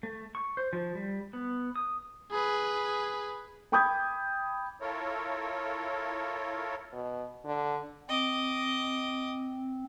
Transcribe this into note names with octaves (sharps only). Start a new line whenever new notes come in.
A3
C#6
C5
F3
G3
B3
D#6
G#4 B4
G5 B5 D6 D#6 G6 G#6
E4 F4 A4 A#4 C#5
B2
D3
C4 D#5 D6